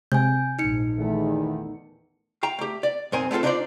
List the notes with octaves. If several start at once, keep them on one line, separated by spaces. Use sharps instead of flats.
C3 G#3 C4 G#5 G6
A#1 G#2 D#4 C#7
E2 D#3 A3
F5 G5 A#5
A3 G4
D5
B1 F#2 C4 A#4 G#5
A3 B3 C4 F4 A4
D4 D#4 F4 G4 C5 D5